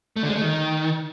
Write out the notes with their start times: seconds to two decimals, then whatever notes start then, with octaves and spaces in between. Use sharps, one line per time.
0.16 A3
0.23 D3
0.29 G#3
0.35 A3
0.42 D#3